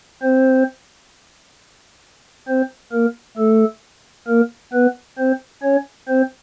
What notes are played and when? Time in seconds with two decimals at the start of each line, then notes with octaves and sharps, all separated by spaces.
0.22 C4 C5
2.48 C4 C5
2.92 A#3 A#4
3.37 A3 A4
4.28 A#3 A#4
4.73 B3 B4
5.18 C4 C5
5.63 C#4 C#5
6.08 C4 C5